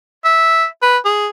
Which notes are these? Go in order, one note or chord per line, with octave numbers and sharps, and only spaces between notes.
E5
B4
G#4